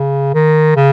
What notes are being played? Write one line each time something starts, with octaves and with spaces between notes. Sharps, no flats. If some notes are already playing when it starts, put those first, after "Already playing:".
Already playing: C#3
D#3
C#3